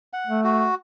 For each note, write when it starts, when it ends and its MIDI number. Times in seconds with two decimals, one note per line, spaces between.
0.13 0.40 78
0.27 0.68 57
0.44 0.75 66